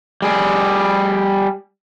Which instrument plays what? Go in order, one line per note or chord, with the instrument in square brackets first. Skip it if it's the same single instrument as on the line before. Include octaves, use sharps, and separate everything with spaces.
[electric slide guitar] G3 G#4